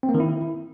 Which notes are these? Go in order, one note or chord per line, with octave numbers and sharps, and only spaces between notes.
C4
A#3
D#3
E4